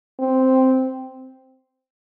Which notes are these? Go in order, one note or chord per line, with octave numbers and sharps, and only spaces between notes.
C4